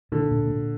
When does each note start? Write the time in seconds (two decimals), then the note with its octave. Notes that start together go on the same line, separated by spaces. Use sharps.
0.12 A#2 D3
0.31 A#2
0.50 A#2